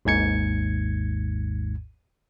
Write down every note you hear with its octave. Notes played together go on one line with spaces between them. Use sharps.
G#1 D#2 G#2 G#6 C#7